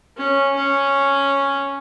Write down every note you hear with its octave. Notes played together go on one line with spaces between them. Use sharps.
C#4
C#4